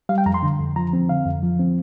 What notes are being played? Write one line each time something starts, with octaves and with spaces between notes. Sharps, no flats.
G3 F5
G5
F2 A#5
C6
D3
F2
F3 A#5
C4
D3 F5
F2
F3
C4